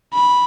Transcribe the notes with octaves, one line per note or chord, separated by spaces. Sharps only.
B5